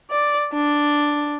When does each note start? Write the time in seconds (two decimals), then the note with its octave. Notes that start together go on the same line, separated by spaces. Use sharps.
0.11 D5
0.53 D4